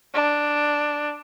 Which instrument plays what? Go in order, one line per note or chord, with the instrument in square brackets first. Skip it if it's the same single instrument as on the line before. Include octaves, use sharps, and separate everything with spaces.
[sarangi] D4